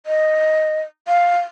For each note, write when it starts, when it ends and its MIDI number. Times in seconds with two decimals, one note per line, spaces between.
0.06 0.82 75
1.08 1.39 77